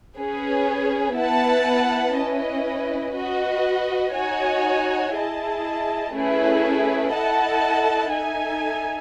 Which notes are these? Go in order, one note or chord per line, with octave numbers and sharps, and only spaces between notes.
C#4 G#4 B4
B3 E4 B4 F#5 A5
C#4 E4 B4 D#5
F#4 B4 D#5
D#4 F#4 C#5 G#5
E4 G#4 D#5 A5
A3 C#4 E4 G#4 B4
E4 A4 D#5 F#5 A5
D#4 A4 E5 G#5